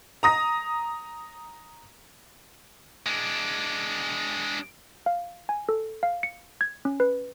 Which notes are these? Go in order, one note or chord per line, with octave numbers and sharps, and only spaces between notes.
A#5 D#6 A#6
G#3 D4
F5
G#5
A4
F5
C#7
G#6
C#4
B4